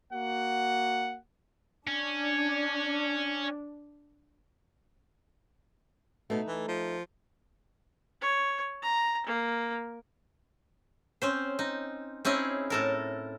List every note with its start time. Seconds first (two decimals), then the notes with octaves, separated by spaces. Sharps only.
0.13 A#3 F#4 F#5
1.88 C#4 D4
6.30 B2 A3 D#4
6.47 E3
6.68 F3
8.21 C#5
8.82 A#5
9.26 A#3
11.22 C4 C#4 C5
11.59 D#4
12.25 C4 C#4 D#4 E4 G#4
12.70 A2 A4 A#4